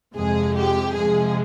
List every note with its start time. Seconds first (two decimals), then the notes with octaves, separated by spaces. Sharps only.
0.16 F2 C3 F3 G#3 G#4
0.57 G4
0.96 C3 F3 G#3 G#4